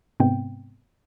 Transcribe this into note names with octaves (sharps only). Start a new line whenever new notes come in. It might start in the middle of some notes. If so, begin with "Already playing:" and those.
G#2 C3 G#3 B3 C4 G5